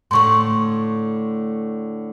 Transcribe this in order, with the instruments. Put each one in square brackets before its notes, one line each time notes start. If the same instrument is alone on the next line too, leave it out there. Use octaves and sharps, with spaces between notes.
[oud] A2 D3 A3 [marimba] C6 C#6